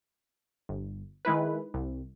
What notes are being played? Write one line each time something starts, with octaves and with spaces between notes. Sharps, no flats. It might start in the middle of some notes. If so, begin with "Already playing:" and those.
G1
D#3 G#3 E4 B4
C2